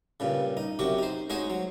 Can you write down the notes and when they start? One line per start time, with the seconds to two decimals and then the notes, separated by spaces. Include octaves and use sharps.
0.20 G2 A#2 C#3
0.57 D#4
0.79 F#2 C3 F#4 G4
0.98 D#4 C5
1.30 G#3 D#4 F#4 C5 C#5 D#5
1.50 F#3